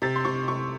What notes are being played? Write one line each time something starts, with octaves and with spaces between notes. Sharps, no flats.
C3 A6
C6
C3 C#6
C3 C#6